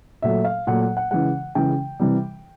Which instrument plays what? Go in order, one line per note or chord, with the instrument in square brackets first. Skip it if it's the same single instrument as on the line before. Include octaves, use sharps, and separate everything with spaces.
[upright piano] A#2 F#3 A3 E5
F5
A#2 F#3 A3 F#5
F#5
F#5
C#3 E3 G#3 F#5
C#3 E3 G#3 G5
C3 E3 G3